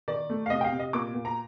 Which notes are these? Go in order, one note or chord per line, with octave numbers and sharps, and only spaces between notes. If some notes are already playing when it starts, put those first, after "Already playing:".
D#3 D5
A3
F5
C3 D#5
G5
F5
C3
D#5
A#2 D6
A#2
A#5